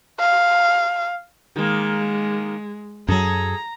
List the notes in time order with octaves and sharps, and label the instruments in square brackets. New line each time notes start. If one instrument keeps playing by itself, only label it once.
[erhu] F5
[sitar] D#3 A#3 [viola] G#3
[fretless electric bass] F#2 F#3 [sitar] G#4 A4 [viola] A#5